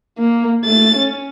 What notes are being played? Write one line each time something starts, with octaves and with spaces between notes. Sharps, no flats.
A#3
A3 A6
C#4